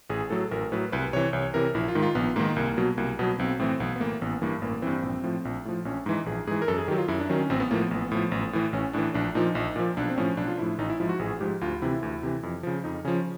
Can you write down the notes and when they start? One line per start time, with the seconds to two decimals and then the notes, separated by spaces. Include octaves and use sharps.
0.10 A1 G#4
0.30 A2 F#3 A4
0.51 A1 A#4
0.72 A2 F#3 B4
0.92 C2 B4
1.13 C3 E3 C#5
1.33 C2 C#5
1.54 C3 E3 A#4
1.75 A#1 E4
1.88 F4
1.95 G#2 D#3
2.02 F4
2.15 A#1 B3
2.36 G#2 D#3 A#3
2.56 C2
2.77 B2 F#3
2.98 C2 A#3
3.19 B2 F#3 B3
3.39 B1 C4
3.59 A2 E3 C4
3.80 B1 B3
3.96 B3
4.00 A2 E3 A#3
4.22 A1 B3
4.42 G2 E3 A#3
4.62 A1 A#3
4.82 G2 E3 C4
5.03 A#1
5.23 A2 F3
5.45 A#1
5.65 A2 F3
5.85 A#1 C#4
6.06 G#2 E3 D#4
6.26 A#1 G#4
6.47 G#2 E3 G#4
6.62 A#4
6.68 F#2 A4
6.78 G#4
6.88 D#3 F#3 G4
6.98 F4
7.08 F#2 E4
7.19 D4
7.29 D#3 F#3 C#4
7.40 C#4
7.50 A1 C4
7.60 B3
7.71 A2 F3 A#3
7.81 B3
7.91 A1
8.11 A2 F3
8.32 A1
8.53 A2 E3
8.73 A1 C#4
8.93 A2 E3 D4
9.14 A#1 D4
9.35 A#2 F3 D#4
9.55 A#1
9.76 A#2 F3
9.97 B1 D4
10.10 C4
10.17 A2 F3 C#4
10.37 B1 D4
10.48 F4
10.58 A2 F3 E4
10.78 A1 D#4
10.90 E4
11.00 G#2 F3 E4
11.09 F#4
11.19 A1 G#4
11.40 G#2 F3 G4
11.61 D2 F4
11.82 C3 E3 E4
12.03 D2
12.23 C3 E3
12.43 F2
12.63 C#3 F3
12.84 F2 D#4
13.04 C#3 F3 C#4